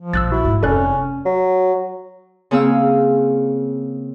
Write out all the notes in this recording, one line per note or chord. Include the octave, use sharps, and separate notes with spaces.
F3
A#1 E6 F#6 A6
E4 F#4
G#2
F1 C#4 A4 D5 F#6
F#3
C#3 A#3 C4 G#4 F5 E6